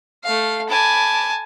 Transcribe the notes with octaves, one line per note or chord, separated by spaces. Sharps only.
A3 F5
G#5 A5 B5 D6